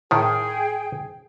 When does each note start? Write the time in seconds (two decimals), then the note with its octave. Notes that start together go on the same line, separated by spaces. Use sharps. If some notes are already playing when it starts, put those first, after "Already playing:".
0.11 A2 D#3 G#4 G5